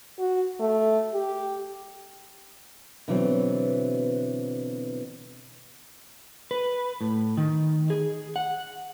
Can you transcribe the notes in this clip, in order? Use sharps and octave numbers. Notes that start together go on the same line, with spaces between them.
F#4
A3
G4
B2 D3 E3 F#3 B3 C4
B4
A2
D#3
G#4
F#5